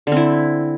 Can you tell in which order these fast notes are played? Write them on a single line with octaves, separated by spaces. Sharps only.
D3 C4 E4